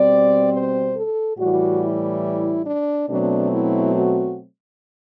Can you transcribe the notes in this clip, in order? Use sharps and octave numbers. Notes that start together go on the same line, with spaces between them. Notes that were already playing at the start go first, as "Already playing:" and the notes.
Already playing: B2 G3 C4 D5
C5
A4
A2 E3 G3 F#4
E4
D4
B2 F#3 A3 C4 D4
E4
F#4